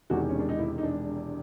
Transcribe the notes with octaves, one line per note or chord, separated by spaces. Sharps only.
E1 E2 C3 D#3 G#3 F#4
C#4
D4
D#4
E4
D#4
D4